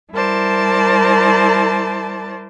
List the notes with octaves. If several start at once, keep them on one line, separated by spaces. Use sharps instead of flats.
G3 E4 A#4 C5 D5 A5